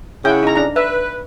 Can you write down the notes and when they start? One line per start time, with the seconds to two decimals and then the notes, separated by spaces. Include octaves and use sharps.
0.25 C#3 C#4 E4 F#5 G5
0.43 D#4 A#5
0.56 D4 A#5
0.76 B4 E5